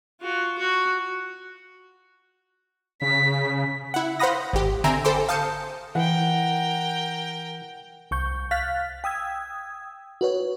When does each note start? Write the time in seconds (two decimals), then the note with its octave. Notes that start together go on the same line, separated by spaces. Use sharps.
0.21 F4 F#4
0.58 F#4
3.02 C#3 B6
3.94 E4 F#5
4.20 C5 F5 F#5 B5 D#6 A#6
4.53 G#1 G4
4.84 D3 C4 E5 G#5 A#5 D7
5.04 A4 C5 G5 B5 C6 D6
5.29 F5 A5 D#6 G6 C#7
5.95 E3 A#4 F#5 G5
8.11 C2 C#6 G6
8.51 F5 F6 F#6 A6 B6
9.04 G5 D#6 E6 G#6
10.21 F#4 B4 C#5